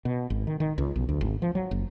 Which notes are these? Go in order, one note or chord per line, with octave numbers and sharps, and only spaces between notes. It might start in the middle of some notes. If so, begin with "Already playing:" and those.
B2
G#1
D#3
D#3
C#2
B1
D2
G#1
F3
F#3
F#1